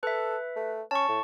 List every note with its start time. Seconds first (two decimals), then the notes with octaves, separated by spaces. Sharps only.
0.03 A4 B4 E5
0.56 A3
0.91 C#4 A5 C#6
1.09 A2